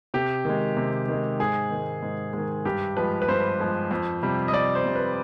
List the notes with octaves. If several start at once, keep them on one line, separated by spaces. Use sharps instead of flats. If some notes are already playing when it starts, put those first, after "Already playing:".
C3 G4
D#3 G#3
C3
D#3 G#3
G#2 G#4
D#3 G#3
G#2
D#3 G#3
G2 G4
F3 G#3 B4
B4
G2 C5
F3 G#3
F2
C3 G3
D#5
F2 D5
C5
C3 G3
B4